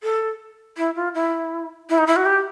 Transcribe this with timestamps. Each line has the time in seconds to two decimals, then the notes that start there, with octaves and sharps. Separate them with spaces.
0.03 A4
0.77 E4
0.95 F4
1.14 E4
1.89 E4
1.98 D#4
2.07 E4
2.16 F#4
2.25 G4